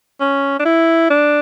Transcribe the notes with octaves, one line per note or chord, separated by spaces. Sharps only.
C#4
D4
E4
D4